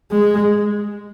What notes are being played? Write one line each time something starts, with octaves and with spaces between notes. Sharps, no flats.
G#3